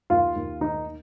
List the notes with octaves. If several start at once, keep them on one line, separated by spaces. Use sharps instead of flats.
D#2 F4
D#2
D#3 D#4